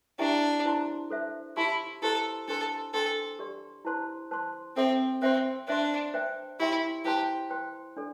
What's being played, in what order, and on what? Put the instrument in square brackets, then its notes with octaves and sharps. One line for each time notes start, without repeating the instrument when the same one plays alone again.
[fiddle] D4 [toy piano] E4 G4 E5 G5
[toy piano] E4 C5 A5 C6
A4 C5 E5
[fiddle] E4 [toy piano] G4 E5 A5 C6
[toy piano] E4 G4 C5 A5 C6 [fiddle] A4
[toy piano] D4 C5 A5 C6 [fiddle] A4
[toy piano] D4 C5 G5 C6 [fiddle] A4
[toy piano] G4 D5 C6
E4 C5 A5 C6
C5 A5 C6
[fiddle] C4 [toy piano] A4 E5 C6
[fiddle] C4 [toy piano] C5 E5 G5 C6
[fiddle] D4 [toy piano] C5 E5 C6
[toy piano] C5 E5 G5
[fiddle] E4 [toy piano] G4 E5 G5 C6
[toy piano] E4 C5 A5 C6 [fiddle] G4
[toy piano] C5 G5 C6
D4 A4 D5